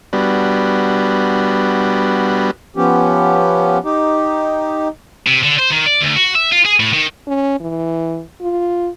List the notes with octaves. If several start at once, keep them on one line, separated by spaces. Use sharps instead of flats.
G3 B3 D4 F#4
F3 B3 C#4 G4
D#4 G4
C3
D3
C5
D#3
D5
D2
F#4
E5
F4
G#4
A2
D#3
C#4
E3
F4